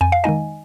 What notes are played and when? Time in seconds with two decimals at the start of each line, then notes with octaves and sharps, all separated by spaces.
0.01 F2 G#5
0.12 F5
0.24 D#3 G#3 D#4 D#5 G#5